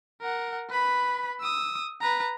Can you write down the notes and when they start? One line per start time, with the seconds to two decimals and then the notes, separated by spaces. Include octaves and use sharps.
0.21 A#4 F#5
0.69 B4 B5
1.40 D#6 E6
2.01 B4 A#5